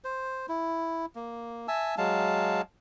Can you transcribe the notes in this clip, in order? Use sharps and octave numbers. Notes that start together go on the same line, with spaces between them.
C5
E4
A#3
E5 G#5 A5 E6
F#3 G#3 F5 A5